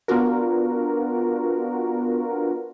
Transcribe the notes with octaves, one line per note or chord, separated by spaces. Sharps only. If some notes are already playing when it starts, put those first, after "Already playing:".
B3 D4 F4 F#4 A#4